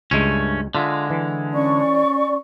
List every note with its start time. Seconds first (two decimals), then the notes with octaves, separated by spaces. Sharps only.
0.11 C#2 G2 G#3 A3 C#4
0.75 D3 G#3 F4 E5
1.10 E3
1.52 C#4 D5 C#6